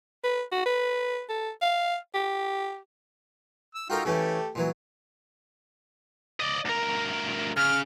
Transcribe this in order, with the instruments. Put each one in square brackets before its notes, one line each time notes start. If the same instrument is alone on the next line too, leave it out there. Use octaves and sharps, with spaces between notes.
[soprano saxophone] B4
F#4
B4
A4
F5
G4
[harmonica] E6
[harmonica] D#4 F4 G5 [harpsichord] F#4 A4 A#4
[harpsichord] C#3 E3 C#4 [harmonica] A3 G4 A4
[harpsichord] A#2 E3 F#3
[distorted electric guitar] D5 D#5
D2 A#4
[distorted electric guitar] C#3 [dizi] F6